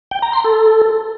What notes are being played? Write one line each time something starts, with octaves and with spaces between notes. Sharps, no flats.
G5
A#5
C6
A4